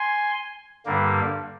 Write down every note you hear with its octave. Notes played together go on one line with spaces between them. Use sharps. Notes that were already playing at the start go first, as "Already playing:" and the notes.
Already playing: G#5 C6
G2 D3 G3 A#3